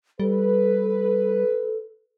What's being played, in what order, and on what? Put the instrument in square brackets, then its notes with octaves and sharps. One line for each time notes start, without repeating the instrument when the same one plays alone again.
[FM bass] G3 [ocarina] A4 [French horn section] B4